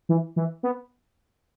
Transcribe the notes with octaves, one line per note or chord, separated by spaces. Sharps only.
E3
E3
B3